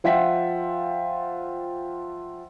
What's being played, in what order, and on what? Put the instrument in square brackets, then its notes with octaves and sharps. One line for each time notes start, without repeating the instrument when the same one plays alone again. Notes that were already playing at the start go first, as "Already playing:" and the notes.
[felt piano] F3 F4 E5 F#5 G5 B6